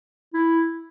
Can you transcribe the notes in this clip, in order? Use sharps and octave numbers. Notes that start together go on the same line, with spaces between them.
E4